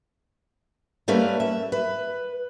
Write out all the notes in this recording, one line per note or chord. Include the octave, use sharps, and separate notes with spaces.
G3 A3 A#3 C#4 B4
E5
B4